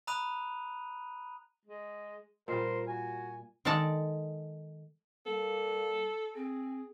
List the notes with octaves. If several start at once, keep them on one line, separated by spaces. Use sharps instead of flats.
A#5 B5 D#6 F#6 D#7 F7
G#3
A#2 G3 A#4 C5
F#4 G#5
D#3 G#3 A4 D5 A5 A#5
G3 A#3 A4
C4 G#4